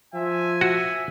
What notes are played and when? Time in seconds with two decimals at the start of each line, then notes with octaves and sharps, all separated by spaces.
0.14 F3 E5 G#5
0.61 F#4 E5